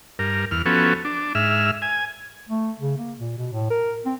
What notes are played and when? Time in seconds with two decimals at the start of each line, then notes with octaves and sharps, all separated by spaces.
0.19 G2 A#4
0.51 E2 F6
0.66 F3 B3 C#4 F#4 A4
1.05 D4
1.35 G#2 E5 F6
1.82 G#5
2.49 A3
2.80 C#3
2.98 A#3
3.18 A#2
3.38 B2
3.52 A2
3.70 A#4
4.06 C4